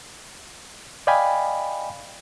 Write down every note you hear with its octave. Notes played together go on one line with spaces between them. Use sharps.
D5 D#5 F5 G5 G#5 B5